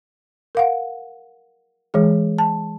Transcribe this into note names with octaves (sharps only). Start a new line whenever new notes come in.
A#4 F5 F#5
E3 G#3 G#4
A5